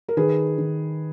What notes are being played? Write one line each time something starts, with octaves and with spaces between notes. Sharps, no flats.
A#4
D#3 G#4 B4
D#3